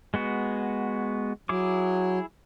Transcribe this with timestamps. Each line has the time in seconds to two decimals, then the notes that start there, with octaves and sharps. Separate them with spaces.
0.14 G#3 B3 F#4
1.49 F#3 E4 G#4 D6